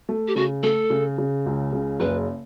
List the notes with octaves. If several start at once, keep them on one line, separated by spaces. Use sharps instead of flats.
A3
G4
C#3 F#4
A3 A4
C#3
C#3
C#2
C#3
F#1 B4